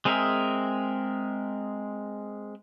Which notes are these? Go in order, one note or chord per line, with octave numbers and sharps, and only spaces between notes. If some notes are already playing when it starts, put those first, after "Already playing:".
G#3 C4 G#4 A#4 E5